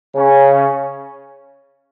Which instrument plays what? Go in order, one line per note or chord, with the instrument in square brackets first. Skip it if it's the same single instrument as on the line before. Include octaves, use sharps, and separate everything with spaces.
[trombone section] C#3 C#4